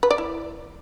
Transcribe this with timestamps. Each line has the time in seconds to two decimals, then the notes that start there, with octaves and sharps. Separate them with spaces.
0.03 B4
0.11 D5
0.18 E4